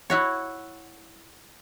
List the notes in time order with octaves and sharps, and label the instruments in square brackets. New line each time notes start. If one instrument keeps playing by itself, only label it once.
[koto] E4 F#4 C#5